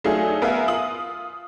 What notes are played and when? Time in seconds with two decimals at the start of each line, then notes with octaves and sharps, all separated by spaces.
0.04 F#3 A3 D4 D#4 F4 G#4
0.42 B3 A#4 E5 F5 G#5
0.68 F4 D#6 F#7